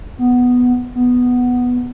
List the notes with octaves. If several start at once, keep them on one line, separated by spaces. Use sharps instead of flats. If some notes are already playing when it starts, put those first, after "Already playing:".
B3
B3